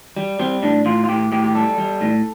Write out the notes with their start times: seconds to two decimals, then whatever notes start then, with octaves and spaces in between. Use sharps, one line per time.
0.17 G3
0.39 G3 C4
0.62 A2 D4
0.85 A2 F4
1.04 F4
1.09 A2 G4
1.32 A2 G4
1.44 G4
1.55 G3 A4
1.78 G3
2.01 A2